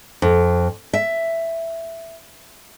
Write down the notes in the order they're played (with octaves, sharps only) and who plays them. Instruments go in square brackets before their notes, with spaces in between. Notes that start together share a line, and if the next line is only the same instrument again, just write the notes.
[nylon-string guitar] F2
E5